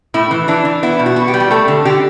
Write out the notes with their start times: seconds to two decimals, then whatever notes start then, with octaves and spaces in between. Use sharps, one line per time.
0.14 A2 E4
0.31 E3
0.48 E3 D4
0.65 E3
0.83 B3 E4
0.99 B2
1.06 F#4
1.16 B3
1.28 G4
1.34 G3
1.40 G4
1.51 A3 A4
1.68 D3
1.85 D3 G4